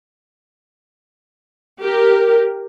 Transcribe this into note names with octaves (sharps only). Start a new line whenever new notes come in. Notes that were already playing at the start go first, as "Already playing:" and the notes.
G4 A#4